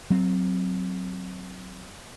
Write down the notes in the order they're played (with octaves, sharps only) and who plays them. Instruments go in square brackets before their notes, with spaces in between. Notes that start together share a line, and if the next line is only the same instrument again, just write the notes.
[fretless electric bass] F#3 C4